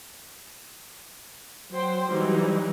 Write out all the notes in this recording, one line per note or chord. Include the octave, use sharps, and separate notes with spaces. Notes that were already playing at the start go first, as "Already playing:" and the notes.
F#3 C5 G5 C6
E3 F#3 G3 D#4